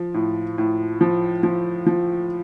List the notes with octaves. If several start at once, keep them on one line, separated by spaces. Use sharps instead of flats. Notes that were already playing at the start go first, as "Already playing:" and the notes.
Already playing: F3
A2
A2
F3
F3
F3